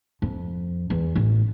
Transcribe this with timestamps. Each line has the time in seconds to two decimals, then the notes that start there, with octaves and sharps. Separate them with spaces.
0.22 F2
0.90 E2
1.15 A1